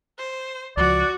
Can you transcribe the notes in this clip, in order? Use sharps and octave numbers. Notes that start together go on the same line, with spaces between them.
C5
C#2 F3 F#4 D5